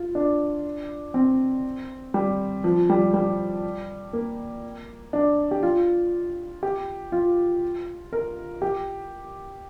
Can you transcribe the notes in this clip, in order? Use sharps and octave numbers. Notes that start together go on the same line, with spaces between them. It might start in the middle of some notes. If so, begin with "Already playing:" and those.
Already playing: F4
D4
C4
G3
F3
G3
G3
A#3
D4
G4
F4
G4
F4
A#4
G4